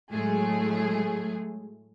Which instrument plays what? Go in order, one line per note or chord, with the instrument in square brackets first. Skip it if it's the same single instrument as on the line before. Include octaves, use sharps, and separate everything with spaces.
[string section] A2 F#3 G#3 A3 G#4